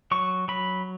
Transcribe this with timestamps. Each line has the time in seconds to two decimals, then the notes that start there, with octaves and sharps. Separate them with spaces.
0.11 F#3 C#6
0.48 F#3 B5